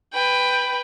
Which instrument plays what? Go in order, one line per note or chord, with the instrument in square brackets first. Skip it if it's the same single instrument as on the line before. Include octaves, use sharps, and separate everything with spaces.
[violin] B4 G5